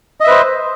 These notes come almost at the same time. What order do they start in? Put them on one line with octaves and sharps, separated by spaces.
D#5 E5 B4 C5